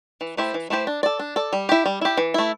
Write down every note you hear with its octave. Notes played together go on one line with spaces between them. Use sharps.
E3
A3 E4 G4 C5
E3
A3 E4 G4 C5
D4
A4 D5
D4
A4 D5
G3
E4 G4
G3
E4 G4
E3
A3 E4